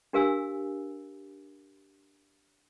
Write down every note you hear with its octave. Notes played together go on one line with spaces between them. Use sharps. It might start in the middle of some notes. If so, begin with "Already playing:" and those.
D4 G4 A#4 F5 G#5 E6